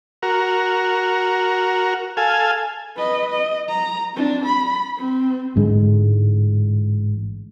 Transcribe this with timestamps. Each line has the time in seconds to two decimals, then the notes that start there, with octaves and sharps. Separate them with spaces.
0.23 F#4 A#4
2.17 A4 F5 G#5
2.97 B4 D#5
3.30 D#5
3.69 A#5
4.14 C4 D4
4.46 B5
4.98 C4
5.56 A1 G#2 D3 G#3